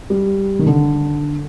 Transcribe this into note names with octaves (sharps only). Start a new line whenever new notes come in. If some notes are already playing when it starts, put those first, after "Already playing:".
G3
D#3
D3